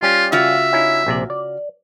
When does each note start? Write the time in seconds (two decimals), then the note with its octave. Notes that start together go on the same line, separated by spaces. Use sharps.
0.02 G3 C#4 F4 G4
0.32 C#3 F4 F#4 E5
0.73 C#4 D#4 E4
1.06 A#1 C3 D5
1.30 D5